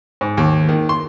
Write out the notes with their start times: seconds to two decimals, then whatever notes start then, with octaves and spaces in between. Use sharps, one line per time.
0.21 G#2
0.37 D#2
0.69 D#3
0.89 C6